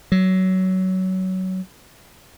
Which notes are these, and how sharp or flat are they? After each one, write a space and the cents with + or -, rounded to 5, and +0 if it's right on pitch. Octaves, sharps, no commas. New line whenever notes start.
F#3 +20